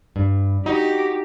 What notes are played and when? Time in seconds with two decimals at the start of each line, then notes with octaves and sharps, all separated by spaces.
0.16 G2
0.66 D#4 F#4 G4